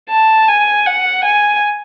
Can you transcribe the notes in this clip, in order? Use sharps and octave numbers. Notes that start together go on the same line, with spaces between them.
A5
G#5
F#5
G#5